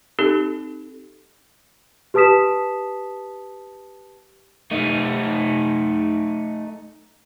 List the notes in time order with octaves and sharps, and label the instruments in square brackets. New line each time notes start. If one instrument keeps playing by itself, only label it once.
[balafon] C4 D#4 G4 A4
[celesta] G4 B4 A5 D#6 B6 E7
[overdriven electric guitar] A3 D#4